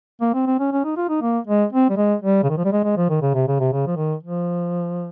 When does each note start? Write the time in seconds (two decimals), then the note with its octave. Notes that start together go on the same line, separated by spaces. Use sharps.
0.21 A#3
0.34 C4
0.47 C4
0.59 C#4
0.72 C#4
0.85 D#4
0.97 F4
1.09 D#4
1.22 A#3
1.47 G#3
1.73 C4
1.90 G3
1.97 G#3
2.22 G3
2.43 C#3
2.50 D#3
2.58 F3
2.65 G3
2.73 G#3
2.84 G#3
2.97 F3
3.09 D#3
3.22 C#3
3.34 C3
3.48 C#3
3.60 C3
3.73 C#3
3.87 F3
3.97 D#3
4.23 F3